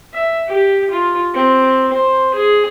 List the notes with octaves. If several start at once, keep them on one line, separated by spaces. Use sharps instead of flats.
E5
G4
F4
C4
C5
G#4